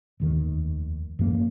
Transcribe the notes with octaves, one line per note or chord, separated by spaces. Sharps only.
F1 D#2 D#3
F#2 F3 A#3